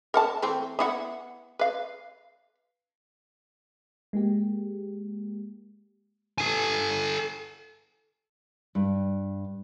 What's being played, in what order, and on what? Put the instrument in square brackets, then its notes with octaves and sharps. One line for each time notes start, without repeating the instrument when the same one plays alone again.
[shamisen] A#4 F#5 A5
E3 A3 C4
B3 E4 F#5
B4 F5
[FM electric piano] G#3 A#3 G4
[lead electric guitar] A4 G#5
[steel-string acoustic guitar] G2